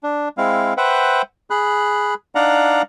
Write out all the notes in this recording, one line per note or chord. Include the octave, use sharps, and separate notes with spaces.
D4
G#3 C4 E4 F5
B4 C5 E5 F#5 G5
G#4 B5 F#6
D4 D#4 D5 F5 F#5 A#5